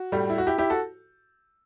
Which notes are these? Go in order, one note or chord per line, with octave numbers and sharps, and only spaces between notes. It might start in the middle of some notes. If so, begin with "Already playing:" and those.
Already playing: F#4
A2 G3
E4
F#4
E4 G4
E4 G4
F#4 A4